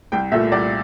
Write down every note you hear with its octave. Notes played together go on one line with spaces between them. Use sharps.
C2 G5
A#2 A3 E5
C2 D5